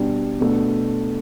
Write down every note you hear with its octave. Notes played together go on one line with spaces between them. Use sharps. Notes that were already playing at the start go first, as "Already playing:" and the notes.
Already playing: B2 G3 D4
B2 A3 D4